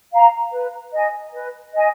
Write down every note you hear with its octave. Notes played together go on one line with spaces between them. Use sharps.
F5 A#5
B4
D#5 G#5
B4
D#5 G#5